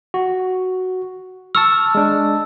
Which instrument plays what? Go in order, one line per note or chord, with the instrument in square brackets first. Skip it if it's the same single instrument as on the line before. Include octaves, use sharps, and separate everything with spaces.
[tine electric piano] F#4
[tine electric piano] A5 C#6 F6 [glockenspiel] E6
[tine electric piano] G#3 D4